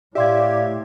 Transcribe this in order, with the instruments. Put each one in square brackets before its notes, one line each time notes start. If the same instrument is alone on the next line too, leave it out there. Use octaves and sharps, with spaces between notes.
[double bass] A2 [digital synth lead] G4 [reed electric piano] D5 F5 [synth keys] E5 C6 G#6